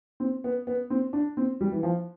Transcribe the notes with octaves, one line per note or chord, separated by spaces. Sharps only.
C4
B3
B3
C4
D4
C4
G3
E3
F3